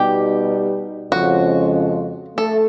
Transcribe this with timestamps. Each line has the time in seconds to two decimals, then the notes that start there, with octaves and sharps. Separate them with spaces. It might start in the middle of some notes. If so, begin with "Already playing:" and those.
Already playing: B2 G3 B3 D#4 G4
1.12 F2 C#3 F3 G#3 C#4 F#4
2.38 A3 A4